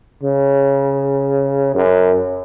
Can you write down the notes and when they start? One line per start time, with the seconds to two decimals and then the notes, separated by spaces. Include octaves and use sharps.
0.23 C#3
1.75 F#2